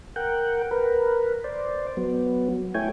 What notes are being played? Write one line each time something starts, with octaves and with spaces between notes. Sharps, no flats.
A#4 F#5 G5
A#4 B4
C5 D5
F#3 B3
A3 E4 C#5 G5 G#5